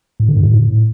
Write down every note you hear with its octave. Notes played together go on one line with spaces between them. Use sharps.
A2
D3
G2
A2